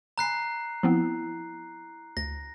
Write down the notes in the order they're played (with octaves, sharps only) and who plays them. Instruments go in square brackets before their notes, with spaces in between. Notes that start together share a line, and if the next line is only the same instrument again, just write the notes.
[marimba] G#5 B5 [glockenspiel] A#5 F#6 C7
[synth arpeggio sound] F3 B3 C4 [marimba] E4
[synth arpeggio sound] D2 [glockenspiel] A#6